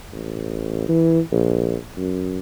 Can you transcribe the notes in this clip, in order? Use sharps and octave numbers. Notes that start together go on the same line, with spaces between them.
A1
E3
A#1
F#2